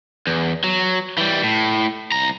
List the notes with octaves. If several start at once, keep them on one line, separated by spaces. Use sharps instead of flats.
E2
F#3
E3 G3
A2
C2 A#5